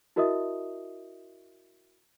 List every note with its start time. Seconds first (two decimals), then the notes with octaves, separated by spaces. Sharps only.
0.16 E4 F#4 A#4 D#5 E5 D#6